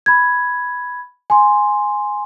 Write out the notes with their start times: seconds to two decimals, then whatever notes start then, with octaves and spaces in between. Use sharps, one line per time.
0.06 B5 G#6
1.30 G#5 C6